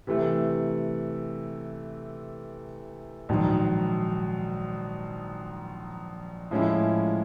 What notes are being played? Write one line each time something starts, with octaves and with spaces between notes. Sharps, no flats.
C3 E3 A3
A#1 G#2 D#3 F#3
A2 F3 G#3 C#4 E4